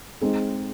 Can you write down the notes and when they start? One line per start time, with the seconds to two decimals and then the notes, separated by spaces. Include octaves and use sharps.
0.21 G#3 C4 D#4 G#4